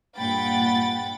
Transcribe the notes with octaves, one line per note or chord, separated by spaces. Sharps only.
G2 A#2 F#5 G5 B5 A6